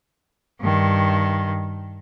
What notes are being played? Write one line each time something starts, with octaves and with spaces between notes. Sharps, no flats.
G2 D#3